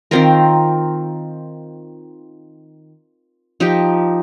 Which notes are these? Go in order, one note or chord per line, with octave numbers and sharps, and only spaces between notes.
D#3 C4 F4 A#4
F3 D#4 G4